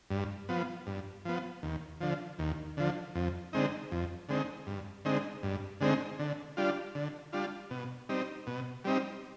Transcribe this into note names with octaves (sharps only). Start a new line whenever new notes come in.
G2
F3 B3
G2
F3 B3
D#2
D3 F3
D#2
D3 F3
F2
D3 G#3 C4 D#4
F2
D3 G#3 C4 D#4
G2
D3 G#3 C4 D#4
G2
D3 G#3 C4 D#4
D3
G3 D4 F4
D3
G3 D4 F4
B2
G3 C4 D#4
B2
G3 C4 D#4